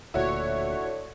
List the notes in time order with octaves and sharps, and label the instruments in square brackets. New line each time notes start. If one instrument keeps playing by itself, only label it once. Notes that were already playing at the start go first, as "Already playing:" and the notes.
[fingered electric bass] D1 D2 A#2 [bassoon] D3 [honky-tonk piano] E4 F#4 [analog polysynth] C#5